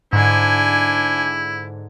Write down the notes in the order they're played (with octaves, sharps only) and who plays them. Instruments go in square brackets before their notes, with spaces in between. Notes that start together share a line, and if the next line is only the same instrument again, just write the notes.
[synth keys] G#2 D3 [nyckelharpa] D4 G#5 [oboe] E4